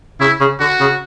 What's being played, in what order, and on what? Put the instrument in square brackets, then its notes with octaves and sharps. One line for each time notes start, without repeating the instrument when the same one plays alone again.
[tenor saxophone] C#3 [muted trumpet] E4
[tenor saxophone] C#3
[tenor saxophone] D3 [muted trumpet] F#4
[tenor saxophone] C#3